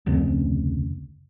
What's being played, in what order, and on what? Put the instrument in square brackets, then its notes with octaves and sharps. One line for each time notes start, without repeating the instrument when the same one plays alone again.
[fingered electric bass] F1 D2 C#3 C4